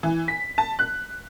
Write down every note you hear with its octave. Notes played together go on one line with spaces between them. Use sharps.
E3
B6
A5
F#6